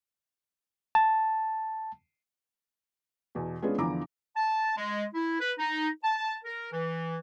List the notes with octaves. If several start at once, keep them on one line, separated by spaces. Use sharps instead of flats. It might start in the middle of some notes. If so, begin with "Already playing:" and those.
A5
E2 B2
G#3 B3 C#4 D4 F4 G#4
E2 D3 F3 E4 A#5 D6
A5
G#3
E4
B4
D#4
A5
A#4
E3